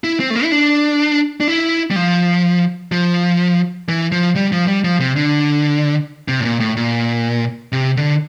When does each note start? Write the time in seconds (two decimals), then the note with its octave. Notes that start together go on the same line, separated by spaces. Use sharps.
0.04 E4
0.20 C4
0.30 A3
0.35 A#3
0.44 E4
0.52 D4
1.40 D4
1.48 E4
1.91 G3
1.96 F3
2.92 F3
3.89 E3
4.12 F3
4.36 G3
4.52 F3
4.68 G3
4.84 F3
5.00 C3
5.16 D3
6.28 C3
6.40 A2
6.45 A#2
6.60 A2
6.76 A#2
7.72 C3
7.97 D3